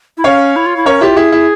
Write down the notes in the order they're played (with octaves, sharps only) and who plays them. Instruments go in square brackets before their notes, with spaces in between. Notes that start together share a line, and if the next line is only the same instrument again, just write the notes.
[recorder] E4
[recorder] C#4 [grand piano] C#5 F5
[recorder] E4
F4
E4
[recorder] C#4 [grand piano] A#4 C#5
[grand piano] E4 G4 [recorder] F4
[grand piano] E4 [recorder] G#4
[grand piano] E4